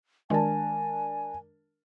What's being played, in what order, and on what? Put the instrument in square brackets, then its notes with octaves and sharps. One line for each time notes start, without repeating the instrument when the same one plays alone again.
[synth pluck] D#3 G#3 [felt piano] D4 A#4 A5 [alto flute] G#5